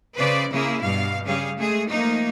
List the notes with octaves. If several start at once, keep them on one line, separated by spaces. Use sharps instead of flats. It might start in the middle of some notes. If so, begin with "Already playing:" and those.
C#3 B4 C5 D5
C#3 A#3 E4 G#4
G2 B2 F5
C#3 G3 G#4 F5
G#3 A3 G#4
F3 A3 A#3 D#4